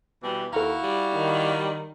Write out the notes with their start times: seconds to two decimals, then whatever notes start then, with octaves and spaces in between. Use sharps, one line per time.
0.22 B2 E3 G3
0.53 D#2 E4 F#4 A4 F5 A#5
0.84 G3
1.14 D#3